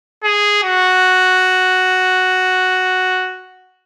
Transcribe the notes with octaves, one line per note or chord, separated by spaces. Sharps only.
G#4
F#4